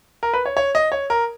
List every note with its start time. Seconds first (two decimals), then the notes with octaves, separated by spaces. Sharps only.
0.23 A#4
0.33 B4
0.46 C#5
0.57 C#5
0.75 D#5
0.92 C#5
1.10 A#4